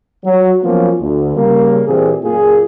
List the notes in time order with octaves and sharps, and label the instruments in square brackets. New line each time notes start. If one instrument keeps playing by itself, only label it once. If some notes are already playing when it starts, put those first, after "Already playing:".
[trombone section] F#3
F3 F#3 A#3 B3 C#4 F4
D2
C#3 G3 A#3
A#2 E3 A#3 C4 G4 G#4
F#2 A#2 A#3 F4 G#4